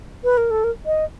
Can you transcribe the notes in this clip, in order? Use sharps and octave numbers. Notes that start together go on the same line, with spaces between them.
B4
A#4
A4
A#4
D#5